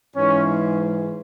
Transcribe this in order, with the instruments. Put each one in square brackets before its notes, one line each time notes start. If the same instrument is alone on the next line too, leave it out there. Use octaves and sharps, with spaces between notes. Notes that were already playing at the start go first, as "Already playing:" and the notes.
[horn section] G#2 E3 C#4